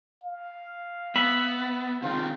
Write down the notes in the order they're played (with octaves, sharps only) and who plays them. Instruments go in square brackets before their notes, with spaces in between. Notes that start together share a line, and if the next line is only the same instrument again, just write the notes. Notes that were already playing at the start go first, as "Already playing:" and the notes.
[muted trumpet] F5
[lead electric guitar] B3 [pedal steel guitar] E5 B5
[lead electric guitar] C3 D#3 [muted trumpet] F4